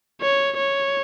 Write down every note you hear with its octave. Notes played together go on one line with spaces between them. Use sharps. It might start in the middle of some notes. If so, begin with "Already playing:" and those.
C#5
C#5